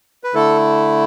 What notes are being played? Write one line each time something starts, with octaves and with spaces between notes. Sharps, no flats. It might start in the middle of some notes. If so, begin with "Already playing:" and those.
B4
D3 A3 E4 A4